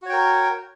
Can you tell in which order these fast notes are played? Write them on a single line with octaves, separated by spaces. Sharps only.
F#4 C#5 G5 A#4